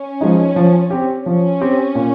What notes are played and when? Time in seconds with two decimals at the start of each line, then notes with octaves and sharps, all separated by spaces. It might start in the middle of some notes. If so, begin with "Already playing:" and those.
Already playing: C#4
0.21 F3 G#3 D#4
0.56 F3
0.91 C4 G4
1.26 F3 C#4
1.61 C4 G4
1.95 A#2